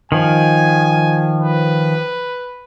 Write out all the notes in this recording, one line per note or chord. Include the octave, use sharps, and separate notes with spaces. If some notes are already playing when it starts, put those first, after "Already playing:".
D#3 F3 G#5
B4